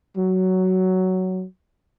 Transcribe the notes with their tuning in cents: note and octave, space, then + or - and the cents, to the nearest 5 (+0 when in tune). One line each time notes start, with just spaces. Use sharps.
F#3 +10